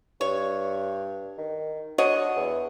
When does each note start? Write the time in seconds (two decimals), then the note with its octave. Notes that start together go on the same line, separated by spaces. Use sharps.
0.21 G2 C#5
1.38 D#3
1.98 D3 F#4 C#5 D#5
2.36 E2